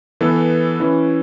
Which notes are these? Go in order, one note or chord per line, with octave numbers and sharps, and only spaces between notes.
E3 B3 A4
E3 C#4 E4